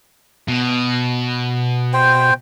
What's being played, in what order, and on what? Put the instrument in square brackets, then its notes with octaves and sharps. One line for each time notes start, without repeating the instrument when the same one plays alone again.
[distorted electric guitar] B2
[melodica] C5 G5